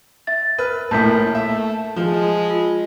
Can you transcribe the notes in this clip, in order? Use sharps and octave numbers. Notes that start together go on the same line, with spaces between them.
E5 A6
A#4 B4 F6
A#1 A2 A#4 A5 G6 B6
A3 E5
F3 G#3
F4